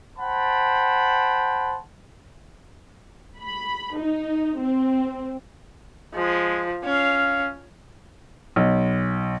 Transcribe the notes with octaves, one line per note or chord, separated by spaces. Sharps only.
C5 F#5 G5 A5 B5
B5
D#4
C4
F3 G#3
C#4 F5
B1